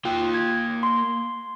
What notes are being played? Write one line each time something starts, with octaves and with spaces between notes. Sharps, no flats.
A#3 F4 G5
G#6
C6